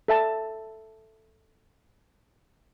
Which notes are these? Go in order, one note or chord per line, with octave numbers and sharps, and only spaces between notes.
A4 E5 A5